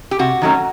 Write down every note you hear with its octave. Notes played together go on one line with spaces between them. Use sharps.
G4
C3 F#4
D#3 F#3 A3 C#4